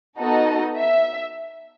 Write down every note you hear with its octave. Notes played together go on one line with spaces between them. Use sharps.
B3 D#4 F#4 A4 D#5
E5